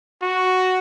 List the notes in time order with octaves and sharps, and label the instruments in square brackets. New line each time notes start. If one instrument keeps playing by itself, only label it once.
[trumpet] F#4